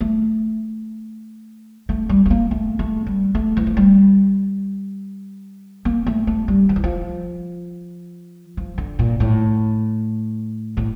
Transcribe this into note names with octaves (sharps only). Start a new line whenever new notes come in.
A3
A3
G3
A3
A#3
A3
A3
G3
A3
E3
F3
G3
A#3
A3
A3
G3
F3
E3
F3
F3
D3
A#2
A2
A2